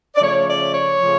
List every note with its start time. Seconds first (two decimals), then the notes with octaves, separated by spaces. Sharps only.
0.15 D5
0.21 C#3 F3 A3 C#5
0.47 D5
0.74 C#5
1.00 C#3 F3 A3